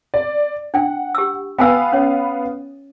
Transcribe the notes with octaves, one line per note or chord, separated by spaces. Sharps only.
D5
D4 F#5 G5
G4 E6
B3 B4 F5 G5 G#5 E6
C#4 C#5